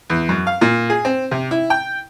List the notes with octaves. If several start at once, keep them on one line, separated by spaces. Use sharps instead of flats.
E2
F#2
F5
A#2
G#4
C4
C3
E4
G5